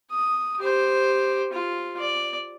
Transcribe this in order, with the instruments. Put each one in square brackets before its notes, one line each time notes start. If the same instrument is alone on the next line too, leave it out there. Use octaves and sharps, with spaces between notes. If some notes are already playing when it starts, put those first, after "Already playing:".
[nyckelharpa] D#6
G4 C5
F4
D5